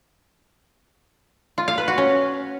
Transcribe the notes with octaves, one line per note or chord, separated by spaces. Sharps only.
F4
F5
B4
F#4
C#4